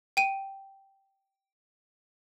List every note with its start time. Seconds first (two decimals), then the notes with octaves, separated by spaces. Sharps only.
0.17 G5 D#7